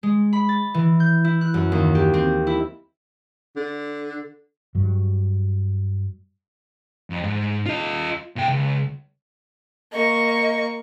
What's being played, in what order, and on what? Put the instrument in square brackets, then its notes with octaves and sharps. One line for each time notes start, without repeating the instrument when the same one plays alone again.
[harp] G#3
B5
A6
E3
G6
E4
F#6
F#2
D#2
G4
C4
E4
[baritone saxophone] D3
[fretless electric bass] G2 F#3
[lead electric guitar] F2
G#2
F4 D#5
A#2 G5
C#2
[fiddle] A#3 C#6 [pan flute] D#5